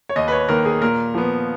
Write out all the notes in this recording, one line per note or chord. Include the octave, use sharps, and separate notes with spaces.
C#5
D#2 D#5
B4
C#5
D#3 A#3 A#4
G#4
A#2 A#4
F3 B3